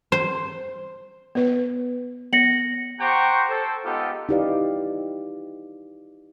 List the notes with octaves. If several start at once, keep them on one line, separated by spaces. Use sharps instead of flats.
C5
B3 B4
B3 A#6 C#7 F#7
G4 C5 F#5 G5 A#5 C#6
A4 C5
G#3 B3 D#4 F4 G4 A4
D#4 E4 G4 B4 D5 F5